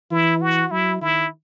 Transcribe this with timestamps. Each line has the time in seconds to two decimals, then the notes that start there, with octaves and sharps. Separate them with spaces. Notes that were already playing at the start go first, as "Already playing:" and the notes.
0.11 E3 E4
0.41 F#4
0.71 F#3 E4
1.01 D#3 E4